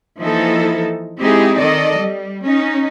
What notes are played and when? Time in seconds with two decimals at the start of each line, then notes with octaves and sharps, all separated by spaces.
0.20 E3 F3 A#3 D#4 E4 A4
1.20 G#3 C4 D#4 E4 G4 G#4
1.56 D#3 A4 D5 D#5
1.98 G3
2.46 C#4 D#4